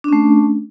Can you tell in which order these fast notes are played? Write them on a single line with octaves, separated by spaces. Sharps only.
D4 C#4 A3